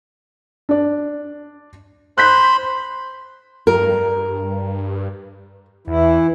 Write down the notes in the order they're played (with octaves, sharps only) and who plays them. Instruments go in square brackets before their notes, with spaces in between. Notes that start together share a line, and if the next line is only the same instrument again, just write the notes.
[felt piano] D4 D5
[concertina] C5 B5 C6 [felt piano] F#6 G6 B6
[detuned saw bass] G2 [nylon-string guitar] A#4
[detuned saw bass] E2 [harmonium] E3 E4